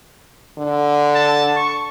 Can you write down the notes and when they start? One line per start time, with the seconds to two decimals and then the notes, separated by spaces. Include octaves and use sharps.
0.58 D3
1.15 A5
1.56 C#6